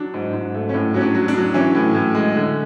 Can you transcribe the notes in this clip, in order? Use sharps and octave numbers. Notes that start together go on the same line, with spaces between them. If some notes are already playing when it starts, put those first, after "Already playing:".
Already playing: F#3 D4
G#2
G#2
A3
C#4
A2 D4
F#3 C#4
D4
F#3
D4
F#3
E3 C#4
A2
A2
G#3
D3